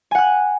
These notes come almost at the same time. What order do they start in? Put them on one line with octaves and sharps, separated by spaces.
G#5 F#5 F#6